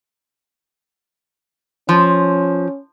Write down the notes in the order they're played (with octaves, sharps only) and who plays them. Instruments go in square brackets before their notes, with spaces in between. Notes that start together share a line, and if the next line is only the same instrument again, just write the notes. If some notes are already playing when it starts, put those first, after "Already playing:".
[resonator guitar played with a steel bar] F3 [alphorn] C#4